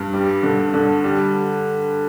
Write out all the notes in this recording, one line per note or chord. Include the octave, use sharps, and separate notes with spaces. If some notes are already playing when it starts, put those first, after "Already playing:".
Already playing: G2
G3
D3
D3
G3